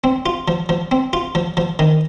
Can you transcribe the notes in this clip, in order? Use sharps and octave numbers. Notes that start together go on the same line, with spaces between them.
C4
F4
F3
F3
C4
F4
F3
F3
D#3